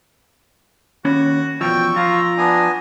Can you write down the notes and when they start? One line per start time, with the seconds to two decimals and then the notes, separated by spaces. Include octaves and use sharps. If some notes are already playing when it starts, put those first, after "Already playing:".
1.05 D#2 C#4 F#4 B5
1.61 E2 B2 F3 G5 C#6 E6
1.96 F3 F4 A#5
2.38 B3 D4 G#5